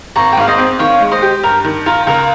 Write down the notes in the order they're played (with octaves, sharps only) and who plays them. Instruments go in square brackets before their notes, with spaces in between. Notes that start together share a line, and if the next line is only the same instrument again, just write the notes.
[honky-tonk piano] G#1 [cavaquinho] A#5 C#6
[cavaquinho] G5
[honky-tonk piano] G#2 [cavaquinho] F5
[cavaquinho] C5 D#5
[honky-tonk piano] C4
[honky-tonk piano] D#3 [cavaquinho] C#5 F5
[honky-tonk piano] G#3
[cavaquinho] C5 D#5
[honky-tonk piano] G4
[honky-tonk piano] G2 [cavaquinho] A#4
[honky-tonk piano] D#3
[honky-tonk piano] F4 [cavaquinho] A#4
[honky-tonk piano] C#2 [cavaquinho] A#4